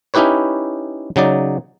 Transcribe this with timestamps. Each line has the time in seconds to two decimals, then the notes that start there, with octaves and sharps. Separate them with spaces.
0.14 C#4 D#4 E4 G4 B4 C#5
1.16 C#3 F#3 D#4 D5